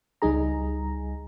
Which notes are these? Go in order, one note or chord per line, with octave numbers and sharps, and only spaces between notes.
C#2 G3 D#4 G#4 A#5